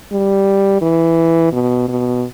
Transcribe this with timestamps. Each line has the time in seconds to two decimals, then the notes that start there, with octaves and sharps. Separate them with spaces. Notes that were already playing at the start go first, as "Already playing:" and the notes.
0.12 G3
0.82 E3
1.53 B2
1.88 B2